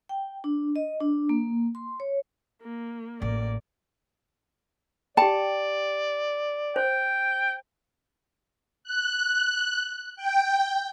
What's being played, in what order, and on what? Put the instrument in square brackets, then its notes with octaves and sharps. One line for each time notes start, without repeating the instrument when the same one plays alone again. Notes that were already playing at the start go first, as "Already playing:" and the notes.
[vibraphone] G5
D4
D#5
D4
A#3
C6
C#5
[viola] A#3
[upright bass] A1 [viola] A#3 D5
[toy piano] G4 G5 [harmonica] D5 [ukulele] A5
[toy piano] C5 [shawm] G5
[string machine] F#6
G5